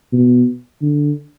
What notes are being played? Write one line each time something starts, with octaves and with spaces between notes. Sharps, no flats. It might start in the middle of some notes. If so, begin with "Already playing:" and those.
B2
D3